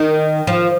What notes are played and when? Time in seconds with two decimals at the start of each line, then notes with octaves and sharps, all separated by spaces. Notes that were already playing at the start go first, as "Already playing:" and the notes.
Already playing: D#3
0.47 F3